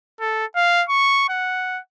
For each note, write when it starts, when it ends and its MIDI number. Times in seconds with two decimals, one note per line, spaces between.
0.21 0.45 69
0.56 0.84 77
0.89 1.28 85
1.29 1.80 78